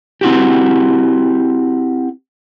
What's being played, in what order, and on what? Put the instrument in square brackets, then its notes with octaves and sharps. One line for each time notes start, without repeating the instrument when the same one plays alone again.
[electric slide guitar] C4 E4 F#4 G4